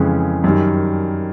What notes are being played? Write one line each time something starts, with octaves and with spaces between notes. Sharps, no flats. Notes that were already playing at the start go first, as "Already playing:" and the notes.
Already playing: F2 C#3 E3 G#3 C#4
F#2 D#3 G3